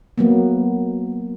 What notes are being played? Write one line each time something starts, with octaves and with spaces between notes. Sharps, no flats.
F#3 A#3 B3